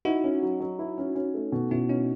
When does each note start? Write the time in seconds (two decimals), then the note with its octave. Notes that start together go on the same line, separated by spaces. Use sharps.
0.05 D#4 E4 F#4
0.24 C#4
0.42 F#3
0.60 F#3
0.79 E4
0.98 C#4
1.15 C#4
1.34 A3
1.52 B2
1.71 B2 C#4 E4
1.89 C#4 D#4